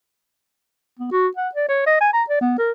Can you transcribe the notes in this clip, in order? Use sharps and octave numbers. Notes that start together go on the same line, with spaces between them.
B3
F#4
F#5
D5
C#5
D#5
G#5
A#5
D5
B3
A#4